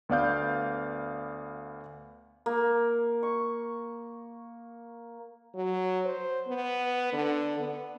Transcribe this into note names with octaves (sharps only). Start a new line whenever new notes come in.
D2 B3 D5 F5 G6
A#3
C#6
F#3
C5
B3
D3
B3